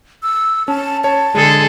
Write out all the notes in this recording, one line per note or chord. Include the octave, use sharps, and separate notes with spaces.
E6
C#4 A5
C#5 A5
D3 G#3 G#4 A4